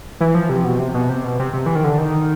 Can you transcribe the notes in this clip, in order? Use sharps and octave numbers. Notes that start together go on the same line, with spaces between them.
E3
F3
C3
B2
C3
B2
C3
B2
C3
C3
E3
D#3
D3
D#3